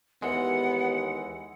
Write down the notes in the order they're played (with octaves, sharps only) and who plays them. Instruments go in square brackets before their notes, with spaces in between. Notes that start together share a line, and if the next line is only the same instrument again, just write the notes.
[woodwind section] D#2 [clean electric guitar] E3 G#3 [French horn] B3 [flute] F#5